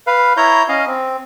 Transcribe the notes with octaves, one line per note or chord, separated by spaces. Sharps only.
B4 F5
E4 C#5 A#5 G6
C#4 D#5 F5
C4